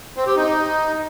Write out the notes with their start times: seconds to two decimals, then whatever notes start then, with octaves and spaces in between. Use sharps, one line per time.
0.17 C4
0.27 G4
0.37 D#4